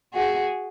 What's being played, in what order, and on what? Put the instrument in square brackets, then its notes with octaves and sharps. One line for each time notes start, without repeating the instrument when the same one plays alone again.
[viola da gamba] F#4 G#4